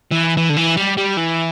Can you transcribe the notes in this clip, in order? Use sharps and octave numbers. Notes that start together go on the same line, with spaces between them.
E3
E3
D3
E3
G3
G3
E3